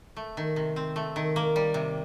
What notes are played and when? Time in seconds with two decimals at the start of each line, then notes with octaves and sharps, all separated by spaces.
0.17 A3
0.37 D#3
0.56 C3
0.76 C4
0.96 A3
1.16 D#3
1.36 A#3
1.56 G3
1.74 C3